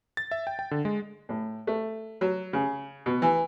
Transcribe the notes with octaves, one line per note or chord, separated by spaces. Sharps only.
A6
E5
G5
G5
D3
G#3
A2
A3
F#3
C#3
B2
E3